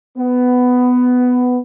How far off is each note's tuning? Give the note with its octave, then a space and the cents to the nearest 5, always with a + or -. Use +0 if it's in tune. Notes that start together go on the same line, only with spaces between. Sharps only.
B3 +10